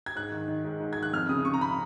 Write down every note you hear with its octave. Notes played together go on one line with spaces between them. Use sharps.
G#6
G#2 F#6
D#3
D#3
G#2
G#2
D#3 G#6
F#6
F2 F6
C#3 D#6
C#3 C#6
A#5
B5